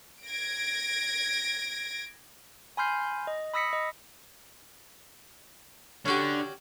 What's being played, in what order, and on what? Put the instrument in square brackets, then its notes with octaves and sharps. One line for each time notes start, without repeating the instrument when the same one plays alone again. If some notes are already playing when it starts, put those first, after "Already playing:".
[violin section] G#6 A#6 D7
[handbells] G#5 B5 C6 F6 G6 C7
D#5
B5 D#6 E6 A#6 B6 C#7
D#5 B5
[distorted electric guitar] D3 [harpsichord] C#4 F#4 G4